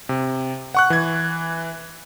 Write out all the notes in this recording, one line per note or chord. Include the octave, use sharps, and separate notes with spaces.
C3
F#5 C#6 F#6
E3 G#6